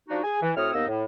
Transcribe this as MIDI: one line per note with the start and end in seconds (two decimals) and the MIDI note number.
0.09 0.20 53
0.09 0.20 62
0.09 0.20 63
0.09 0.20 66
0.23 0.37 68
0.23 0.37 80
0.42 0.51 52
0.56 0.70 45
0.56 0.70 60
0.56 0.70 66
0.56 0.70 73
0.56 0.70 87
0.56 0.70 89
0.74 0.87 39
0.74 0.87 58
0.74 0.87 59
0.74 0.87 63
0.74 0.87 75
0.74 0.87 88
0.88 1.04 45